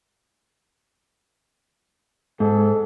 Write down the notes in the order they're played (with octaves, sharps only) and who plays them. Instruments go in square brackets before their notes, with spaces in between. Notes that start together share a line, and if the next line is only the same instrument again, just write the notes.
[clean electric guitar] G#2 [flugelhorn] A4